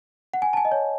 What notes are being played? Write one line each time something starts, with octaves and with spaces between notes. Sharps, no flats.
F#5
G#5
A5
G#5
D#5
C#5